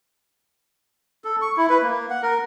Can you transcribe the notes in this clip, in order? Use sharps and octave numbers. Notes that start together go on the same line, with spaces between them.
A4
C#6
E4
B4
A#3
F#5
A#4